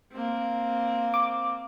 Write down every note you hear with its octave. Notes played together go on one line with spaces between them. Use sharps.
A#3 C4
D6